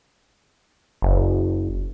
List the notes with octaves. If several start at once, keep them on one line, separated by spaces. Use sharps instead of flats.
F#1